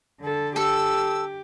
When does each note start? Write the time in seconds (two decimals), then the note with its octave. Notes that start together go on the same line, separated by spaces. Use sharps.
0.20 D3 A4
0.56 G4 A4 E6